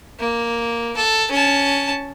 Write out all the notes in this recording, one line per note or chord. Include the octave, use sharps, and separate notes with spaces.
A#3
A4
C#4 A5